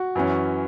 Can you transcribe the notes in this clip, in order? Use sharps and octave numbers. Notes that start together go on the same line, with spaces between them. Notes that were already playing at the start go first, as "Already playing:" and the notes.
Already playing: F#4
F#2 E3 C#4